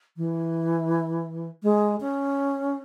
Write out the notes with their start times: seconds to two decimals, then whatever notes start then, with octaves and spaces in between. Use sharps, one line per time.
0.17 E3
1.63 G#3
2.00 C#4